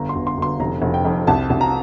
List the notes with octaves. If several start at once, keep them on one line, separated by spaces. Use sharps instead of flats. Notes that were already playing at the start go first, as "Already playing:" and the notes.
Already playing: G1 A#5
C6
G1
C6
G1 C6
F1 A#5
F1
G5
F2
C2 A5
C2
A#5